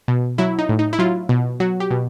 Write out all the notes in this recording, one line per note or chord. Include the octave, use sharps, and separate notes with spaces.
B2
F#3 E4
D#4
A2
D#4
E4
F#3 F4
B2
F#3 F#4
G4
B2